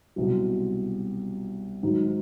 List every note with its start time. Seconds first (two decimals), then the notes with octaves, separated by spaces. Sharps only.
0.16 C2 B2 F#3
1.83 G#2 D#3 F#3